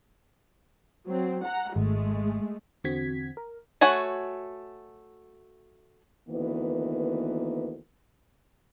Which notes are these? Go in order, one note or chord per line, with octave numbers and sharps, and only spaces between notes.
F#3 C4
F#5 A#5
G#1 G#3 A3
E2 D3 C4 F#4 G#6 B6
A#4
A3 F#4 C#5 F#5 G#5
D2 D#3 E3 A#3 B3